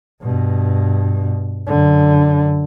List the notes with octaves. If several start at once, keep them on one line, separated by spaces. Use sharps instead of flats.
G2 B2
F#2 D3